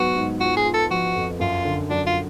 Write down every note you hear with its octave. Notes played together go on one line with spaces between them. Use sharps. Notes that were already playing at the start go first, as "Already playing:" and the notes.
Already playing: G#2 F#3 B3 F#4
G#2
F4 F#4
G#4
F4
A4
F3 F#4
F2
F#2 F4
D3
F#3 D4
F4